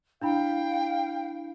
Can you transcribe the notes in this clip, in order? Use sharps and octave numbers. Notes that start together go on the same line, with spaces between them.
D4 E4 F5 G5 B5